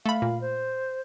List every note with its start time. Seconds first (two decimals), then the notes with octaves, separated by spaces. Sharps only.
0.06 A3 F5 B5
0.22 A#2
0.41 C5